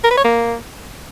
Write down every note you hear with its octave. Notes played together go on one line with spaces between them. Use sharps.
A#4
B4
C#5
A#3